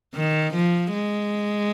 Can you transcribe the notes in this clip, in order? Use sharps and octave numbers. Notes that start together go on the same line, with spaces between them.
D#3
F3
G#3